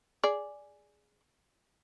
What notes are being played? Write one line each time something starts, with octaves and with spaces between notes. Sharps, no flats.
G#4 D5